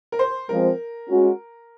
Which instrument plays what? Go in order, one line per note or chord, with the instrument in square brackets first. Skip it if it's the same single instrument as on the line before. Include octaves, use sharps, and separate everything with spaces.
[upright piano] A#4
C5
[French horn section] F3 G#3 C4 F4 C5 [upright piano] A#4
[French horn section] G#3 C#4 F#4